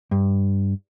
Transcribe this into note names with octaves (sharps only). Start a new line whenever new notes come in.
G2